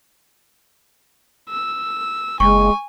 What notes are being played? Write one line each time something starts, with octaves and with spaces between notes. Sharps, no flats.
E6
F#1 G#3 G#5 C#6